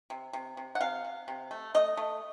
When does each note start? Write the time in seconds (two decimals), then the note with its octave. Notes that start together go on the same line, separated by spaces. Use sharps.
0.10 C3
0.33 C3
0.57 C3
0.75 F#5
0.81 C3 F5
1.05 C3
1.28 C3
1.51 A3
1.74 A3 D#5
1.97 A3